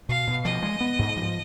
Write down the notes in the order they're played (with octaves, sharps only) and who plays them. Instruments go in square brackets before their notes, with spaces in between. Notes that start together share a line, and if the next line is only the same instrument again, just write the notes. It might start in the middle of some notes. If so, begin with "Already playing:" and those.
[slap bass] B2 [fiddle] F5
[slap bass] B2
[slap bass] F3 [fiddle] D#5
[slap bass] G#3
B3
G#2
F3